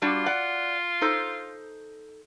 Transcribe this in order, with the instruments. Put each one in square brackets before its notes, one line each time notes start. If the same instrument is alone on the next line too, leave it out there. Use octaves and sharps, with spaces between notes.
[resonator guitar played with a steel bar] G3 D4 F#4 [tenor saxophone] F4
[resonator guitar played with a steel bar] D5 F#5
D#4 A4 C5